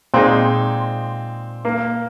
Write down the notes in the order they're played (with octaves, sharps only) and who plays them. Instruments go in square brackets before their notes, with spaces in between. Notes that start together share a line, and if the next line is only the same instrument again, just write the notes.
[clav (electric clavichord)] A#2 G#3 D#4 G#4 [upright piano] C4
[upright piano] A#3